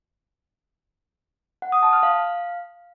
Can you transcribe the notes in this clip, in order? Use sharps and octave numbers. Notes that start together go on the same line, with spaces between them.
F#5
D#6
A5
F6
F5